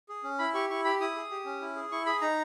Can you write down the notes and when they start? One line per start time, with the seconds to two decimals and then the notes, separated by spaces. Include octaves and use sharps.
0.09 G#4
0.24 C#4
0.39 E4 B5
0.54 G4 C#6
0.70 E4 C#6
0.84 G4 B5
1.00 E4 D#6
1.16 G#4
1.31 G4
1.45 C#4
1.61 E4
1.76 G#4
1.92 E4 C#6
2.06 G#4 B5
2.21 D#4 A#5